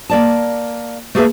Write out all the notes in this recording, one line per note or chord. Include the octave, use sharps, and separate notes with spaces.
A#3 D5 A5
A3 A#3 G#4 A4 B4 E5